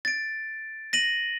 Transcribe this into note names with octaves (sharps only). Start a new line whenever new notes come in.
A6 D7
A#6 D#7 F#7